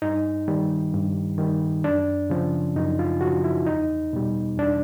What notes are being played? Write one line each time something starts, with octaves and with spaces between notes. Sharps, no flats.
G2 D#4
D#3 G3
G2
D#3 G3
F#2 D4
C#3 F3
F#2 D#4
F4
C#3 F3 F#4
E4
E2 D#4
B2 G3
E2 D4